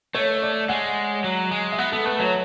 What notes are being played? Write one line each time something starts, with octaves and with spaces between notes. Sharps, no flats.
A3 C#5
D5
G#3 F#5
F#3
G#3
E5
B3 F#5
B3 A4
A3 B4
F#3 C#5